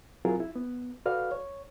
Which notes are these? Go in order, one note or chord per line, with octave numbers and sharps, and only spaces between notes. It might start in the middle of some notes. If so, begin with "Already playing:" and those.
F#3 C4 E4 F4 G#4 A#4
E4
B3
F#4 A4 B4 D5 F5 F6
C#5